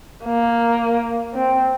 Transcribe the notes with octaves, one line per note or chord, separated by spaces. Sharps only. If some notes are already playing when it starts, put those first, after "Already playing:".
A#3
C4